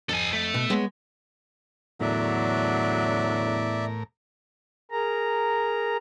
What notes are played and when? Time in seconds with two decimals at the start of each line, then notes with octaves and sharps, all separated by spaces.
0.09 F2 A4 G#5
0.33 A3
0.54 B2
0.70 G#3 B3 C#5
2.00 E2 A2 D3 F#3 A#4 D5 E5
4.91 G#4 A#4 A#5